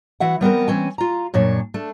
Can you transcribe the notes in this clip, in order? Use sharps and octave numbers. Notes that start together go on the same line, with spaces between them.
E3 F#4 E5 F#5
G3 B3 C4 A#4
E3 C4 C#4 G#5
F4 A#5
F#2 A#2 D4 C#5
A3 D4